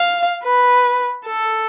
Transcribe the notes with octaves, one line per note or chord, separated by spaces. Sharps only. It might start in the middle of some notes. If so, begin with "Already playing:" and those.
Already playing: F5
B4
A4